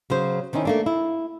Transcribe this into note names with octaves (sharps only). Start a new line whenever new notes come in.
C#3 F#3 C5
D#3 C4 C#4 D#4 E4
A3 A#3 D4
E4